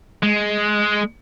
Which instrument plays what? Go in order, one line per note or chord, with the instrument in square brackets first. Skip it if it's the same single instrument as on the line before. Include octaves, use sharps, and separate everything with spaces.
[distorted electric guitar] G#3